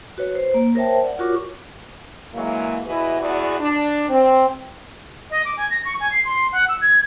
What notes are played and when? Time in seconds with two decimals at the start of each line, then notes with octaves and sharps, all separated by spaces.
0.18 F#4 B4 C#5
0.35 C5
0.54 A#3
0.75 A#4 C5 C#5 E5 G5 A5
1.03 D5 F#5
1.19 F4 F#4 A#4 C#5 C#6 D6
2.34 E3 F#3 G#3 A#3
2.87 E2 E3 E4 F#4 B4 D#5
3.21 E2 F#4 D5
3.59 D4
4.10 C4
5.31 D#5
5.45 D6
5.57 G#5
5.70 A#6
5.85 C#6
6.00 G#5
6.12 C7
6.25 C6
6.52 F#5
6.69 E6
6.81 G#6